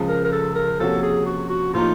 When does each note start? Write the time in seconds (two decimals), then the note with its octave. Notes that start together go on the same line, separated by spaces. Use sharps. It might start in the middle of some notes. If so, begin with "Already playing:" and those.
Already playing: C#2 C#3 F3 G#3
0.09 A#4
0.24 A#4
0.32 A4
0.55 A#4
0.79 C3 F3 A#3 C#4 F#4 A4
1.03 G#4
1.26 F#4
1.49 F#4
1.73 A2 F3 A#3 D#4 F4